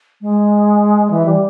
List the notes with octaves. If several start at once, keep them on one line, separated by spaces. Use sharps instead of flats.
G#3
E3
G3